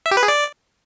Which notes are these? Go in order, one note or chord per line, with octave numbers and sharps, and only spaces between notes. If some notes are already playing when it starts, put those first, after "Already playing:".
E5
G4
B4
G#4
D5